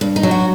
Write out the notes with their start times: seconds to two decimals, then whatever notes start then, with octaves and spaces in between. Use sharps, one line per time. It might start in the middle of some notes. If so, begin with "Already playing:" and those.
0.01 G2
0.16 D#4
0.23 F#3
0.31 F#4